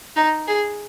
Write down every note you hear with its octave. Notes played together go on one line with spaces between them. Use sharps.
D#4
G#4